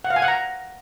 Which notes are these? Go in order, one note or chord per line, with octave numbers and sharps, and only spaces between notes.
F#5
F5
G#5
F#5
A#5